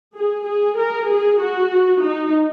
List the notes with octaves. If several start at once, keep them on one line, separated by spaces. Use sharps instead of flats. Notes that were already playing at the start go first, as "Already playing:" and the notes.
G#4
G#4
A#4
G#4
F#4
D#4